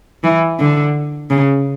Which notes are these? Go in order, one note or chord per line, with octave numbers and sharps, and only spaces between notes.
E3
D3
C#3